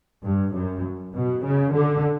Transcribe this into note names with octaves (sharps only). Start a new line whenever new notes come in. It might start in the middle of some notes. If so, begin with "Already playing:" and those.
G2
F#2
B2
C#3
D3